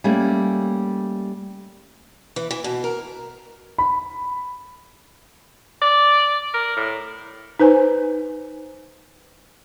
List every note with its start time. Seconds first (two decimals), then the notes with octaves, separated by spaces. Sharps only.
0.04 G3 A3 A#3 C#4
2.36 E3
2.51 E3
2.64 B2
2.84 A#4
3.78 B5
5.82 D5
6.54 A#4
6.77 A2
7.60 D#4 B4 C5 G#5